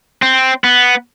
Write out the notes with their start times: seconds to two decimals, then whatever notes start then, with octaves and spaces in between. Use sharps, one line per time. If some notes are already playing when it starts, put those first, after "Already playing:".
0.22 C4
0.64 B3